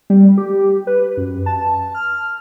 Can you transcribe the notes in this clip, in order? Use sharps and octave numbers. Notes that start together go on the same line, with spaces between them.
G3
G4
B4
F#2
A5
F6